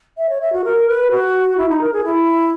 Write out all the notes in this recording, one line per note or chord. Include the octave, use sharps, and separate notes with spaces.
E5
C#5
E5
F#4
A#4
B4
F#4
E4
D#4
A#4
G#4
E4